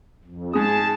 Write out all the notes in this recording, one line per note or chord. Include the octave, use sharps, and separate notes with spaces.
F2
G#2 G#4 A5 D#6